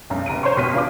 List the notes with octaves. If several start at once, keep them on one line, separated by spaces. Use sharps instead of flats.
F1 B1 F#2
F1 A#5 D7 D#7
C5 C#5 A#5 C6 C#6
F1 B2 C6 F6 B6 D#7
G#1 F4 G#4 B4 D5 D6